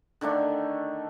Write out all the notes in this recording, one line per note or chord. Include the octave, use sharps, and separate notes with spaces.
D3 D#3 A3 D4